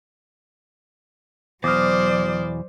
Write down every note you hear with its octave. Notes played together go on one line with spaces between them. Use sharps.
E2 B2 F#3 C5 D5 D6 D#6 F6